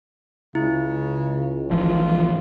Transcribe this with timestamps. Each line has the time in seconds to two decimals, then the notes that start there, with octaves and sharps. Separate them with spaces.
0.55 C#2 C#3 E4
1.71 G#1 E3 F3 F4